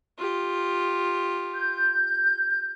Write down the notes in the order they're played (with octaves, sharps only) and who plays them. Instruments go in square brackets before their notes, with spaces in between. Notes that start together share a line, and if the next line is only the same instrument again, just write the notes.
[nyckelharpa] F4 G4
[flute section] G6